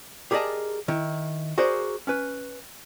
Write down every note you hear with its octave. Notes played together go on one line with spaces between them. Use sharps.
G4 G#4 A#4 D5 D#5 A5
D#3 E4
F#4 G#4 A#4 C5 D5
C#4 B4